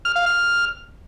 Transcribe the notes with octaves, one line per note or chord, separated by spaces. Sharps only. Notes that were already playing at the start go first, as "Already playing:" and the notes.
F6
F5
F6